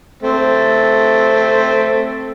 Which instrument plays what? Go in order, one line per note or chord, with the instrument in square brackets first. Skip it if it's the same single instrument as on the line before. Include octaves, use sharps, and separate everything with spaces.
[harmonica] A3 C4